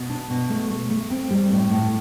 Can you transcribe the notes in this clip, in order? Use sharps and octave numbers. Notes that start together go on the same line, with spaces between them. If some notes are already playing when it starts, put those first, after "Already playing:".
Already playing: B2
D4
B2
A3
A3
A3
C4
G3
A2
A2